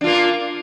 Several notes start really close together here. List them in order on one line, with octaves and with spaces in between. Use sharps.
D4 F4 A#3